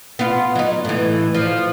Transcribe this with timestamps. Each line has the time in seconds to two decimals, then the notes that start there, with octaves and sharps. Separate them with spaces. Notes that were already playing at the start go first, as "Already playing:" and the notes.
0.19 B3 F4
0.55 F#3 D#4
0.85 A2 E3
1.35 F3